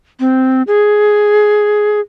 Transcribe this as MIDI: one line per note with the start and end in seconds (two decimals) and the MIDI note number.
0.20 0.62 60
0.67 2.00 68